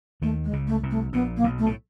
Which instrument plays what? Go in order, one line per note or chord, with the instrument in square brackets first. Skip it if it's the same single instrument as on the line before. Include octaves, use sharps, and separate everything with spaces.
[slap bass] D#2 D#3 [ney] A3
[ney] G#3
[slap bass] C#2 C#3
[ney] A3
[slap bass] C2 C3
[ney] A3
[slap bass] A#1 A#2 [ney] B3
[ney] A#3
[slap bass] B1 B2
[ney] A3
[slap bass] A2